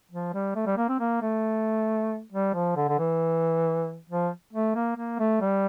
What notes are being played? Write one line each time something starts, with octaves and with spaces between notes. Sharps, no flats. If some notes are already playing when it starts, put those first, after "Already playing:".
F3
G3
A3
G3
A#3
C4
A#3
A3
G3
F3
D3
D3
E3
F3
A3
A#3
A#3
A3
G3